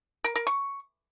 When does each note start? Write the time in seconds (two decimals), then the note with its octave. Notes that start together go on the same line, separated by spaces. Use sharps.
0.24 A#4
0.36 A#4
0.47 C#6